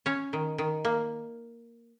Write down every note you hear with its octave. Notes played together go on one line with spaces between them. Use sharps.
C#4 C#5
D#3
D#3
A#3